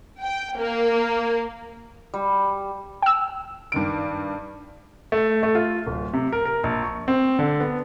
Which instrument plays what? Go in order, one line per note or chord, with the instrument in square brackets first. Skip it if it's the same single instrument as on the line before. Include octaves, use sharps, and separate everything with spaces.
[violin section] G5
A#3
[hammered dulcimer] G3
[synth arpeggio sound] G5 E6
[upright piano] G2 D#3 D7
[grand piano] A3
A3
F4
D1
C3
A#4
A#4
A#1
C#6
C4
D3
B3